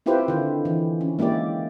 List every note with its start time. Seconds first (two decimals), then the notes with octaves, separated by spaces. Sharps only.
0.06 C4 E4 F4 G4 B4 C5
0.28 D3 D#3
0.65 E3
1.01 C#4
1.19 G#3 A#3 E4 G4 D5